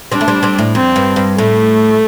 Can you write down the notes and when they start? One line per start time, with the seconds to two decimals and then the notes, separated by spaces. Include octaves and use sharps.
0.12 G3 C4 D4
0.21 A3
0.28 G3 C4
0.43 G3 C4
0.59 A2
0.75 F2 C4
0.96 G2
1.16 G2
1.37 A2 A3